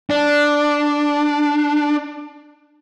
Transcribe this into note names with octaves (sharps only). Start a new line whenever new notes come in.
D4